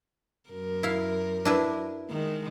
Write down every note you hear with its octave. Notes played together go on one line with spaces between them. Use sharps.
F#2 A#4
E4 F5
D4 E4 B4
D#3 G#3